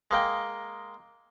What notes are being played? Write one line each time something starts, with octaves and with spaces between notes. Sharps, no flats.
G#3 A#3 G5